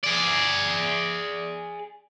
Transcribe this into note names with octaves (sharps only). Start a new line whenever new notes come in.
G#4 D5